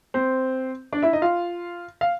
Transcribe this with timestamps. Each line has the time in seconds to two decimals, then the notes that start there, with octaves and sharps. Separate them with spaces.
0.14 C4 C5
0.93 D4 D5
1.02 E4 E5
1.13 D#4 D#5
1.22 F4 F5
2.01 F5